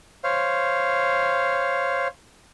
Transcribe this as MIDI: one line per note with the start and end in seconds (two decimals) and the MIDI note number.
0.24 2.08 72
0.24 2.08 73
0.24 2.08 77